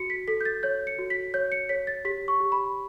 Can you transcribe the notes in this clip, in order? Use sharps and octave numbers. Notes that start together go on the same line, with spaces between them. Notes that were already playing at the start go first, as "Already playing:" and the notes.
Already playing: F#4 C#7
B6
A4 B6
G6
A6
C#5 G6
C#7
F#4
B6
C#5 G6
C#7
C#5 B6
A6
G4 B6
C#6
G4
B5